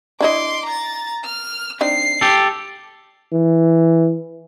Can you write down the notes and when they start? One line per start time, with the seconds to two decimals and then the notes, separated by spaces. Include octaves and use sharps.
0.21 D4 E4 D#5 C6 D6
0.65 A#5 A6
1.25 F6
1.81 C4 D4 D#4 C7
2.21 G4 A4
3.33 E3